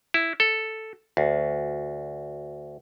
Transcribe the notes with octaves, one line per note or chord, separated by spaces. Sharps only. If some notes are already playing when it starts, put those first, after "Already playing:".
E4
A4
D2